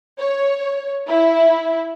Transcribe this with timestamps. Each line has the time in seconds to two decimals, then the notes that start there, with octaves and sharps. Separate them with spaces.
0.19 C#5
1.09 E4